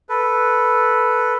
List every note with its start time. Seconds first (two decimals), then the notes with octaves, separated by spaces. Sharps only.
0.09 A4 B4